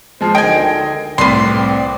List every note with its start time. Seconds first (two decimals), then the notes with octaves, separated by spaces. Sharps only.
0.21 F3 G#3 C5
0.35 D2 D3 D#3 D#5 G5 G#5
1.18 C2 A2 C4 B4 D5 C6